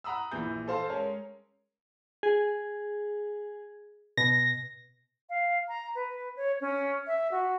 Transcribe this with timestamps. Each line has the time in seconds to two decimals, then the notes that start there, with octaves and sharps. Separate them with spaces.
0.04 F#5 A#5 B5 D#6 E6
0.32 A#1 E3 G6
0.68 A4 C5 F5 A5
0.89 G#3 C#4 A#4 C#5
2.23 G#4
4.17 B2 A#6
5.30 F5
5.68 A#5
5.95 B4
6.37 C#5
6.61 C#4
7.07 E5
7.31 F#4